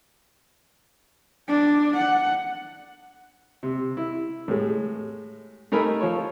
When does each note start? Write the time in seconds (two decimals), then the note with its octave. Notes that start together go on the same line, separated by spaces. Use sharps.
1.48 D4
1.97 F#5
3.63 C3
3.97 E4
4.48 A2 G#3
5.72 A3 D#4 A#4 G#5 B5
6.01 F3 C#5